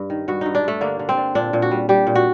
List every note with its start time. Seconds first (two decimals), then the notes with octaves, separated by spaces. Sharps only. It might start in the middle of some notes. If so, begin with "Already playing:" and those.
Already playing: G2
0.10 D#3
0.28 G2 F#4
0.41 G2 D#4
0.55 D4
0.64 G2 A3
0.81 D3 A#3
0.99 D3
1.09 C4
1.17 D3
1.35 A#2 D4
1.53 A#2
1.62 F#4
1.71 G3
1.89 G3 G4
2.07 A#2
2.15 F#4